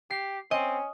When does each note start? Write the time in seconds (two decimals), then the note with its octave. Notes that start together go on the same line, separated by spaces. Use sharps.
0.10 G4 C7
0.51 C4 C#4 D#5